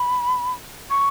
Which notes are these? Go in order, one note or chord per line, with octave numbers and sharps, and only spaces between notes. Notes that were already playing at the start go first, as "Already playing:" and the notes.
Already playing: B5
C#6